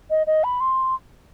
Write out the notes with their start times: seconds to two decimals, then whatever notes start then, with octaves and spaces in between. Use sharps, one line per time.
0.10 D#5
0.27 D#5
0.44 B5
0.60 C6